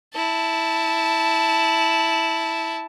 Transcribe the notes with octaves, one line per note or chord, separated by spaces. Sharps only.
E4 A5